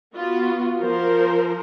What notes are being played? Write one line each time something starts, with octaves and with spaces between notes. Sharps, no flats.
B3 F4 F#4
F3 A#4 C5